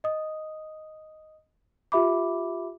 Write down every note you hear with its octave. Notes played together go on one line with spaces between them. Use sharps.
D#5 D#6
F4 G4 E5 B5 D6